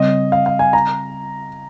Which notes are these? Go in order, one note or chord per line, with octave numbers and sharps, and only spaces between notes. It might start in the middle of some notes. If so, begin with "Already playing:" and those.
Already playing: C#3 G3 C4 D#5
F5
F5
G#5
A#5